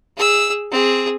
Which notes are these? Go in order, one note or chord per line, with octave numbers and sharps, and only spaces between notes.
G#4 E6
C4 G#4